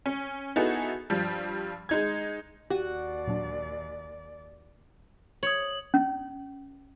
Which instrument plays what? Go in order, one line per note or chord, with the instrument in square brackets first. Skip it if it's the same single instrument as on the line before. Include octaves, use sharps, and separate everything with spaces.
[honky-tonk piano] C#4
B3 D#4 E4 F#4 G#4 A4
G2 F3 G3
G#3 D#4 G#6
[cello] D#2 D5 [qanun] F#4 [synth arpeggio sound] G4 D#7
[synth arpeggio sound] A#2 F#3 D4
[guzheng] C#5 [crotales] D#6 F#7
[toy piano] C#4